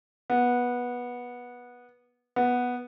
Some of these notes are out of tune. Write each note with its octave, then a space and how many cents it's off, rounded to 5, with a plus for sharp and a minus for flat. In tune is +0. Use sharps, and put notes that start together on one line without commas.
B3 -15
B3 -5